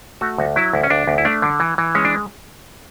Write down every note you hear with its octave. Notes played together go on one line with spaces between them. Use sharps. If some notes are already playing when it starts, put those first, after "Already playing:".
A3 F#4
D2
F#3 E4
D2
C#4
D2 D4
D2
E4
A3 D4
D3
E3
E3
G#3 C#4
D4